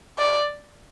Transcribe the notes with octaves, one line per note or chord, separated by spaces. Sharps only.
D5